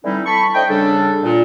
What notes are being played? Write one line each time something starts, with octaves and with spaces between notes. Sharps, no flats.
D3 E3 G3 C4 D#4 E4
A4 A5 B5 C#6
A3 D4 C5 D#5 G5
C#3 G3 D4 A4
A#2